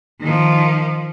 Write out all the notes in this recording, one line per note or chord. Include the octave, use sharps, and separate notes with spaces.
D#3 F3